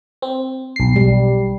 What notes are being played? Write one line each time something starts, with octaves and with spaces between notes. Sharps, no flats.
C4
B1 C7
G3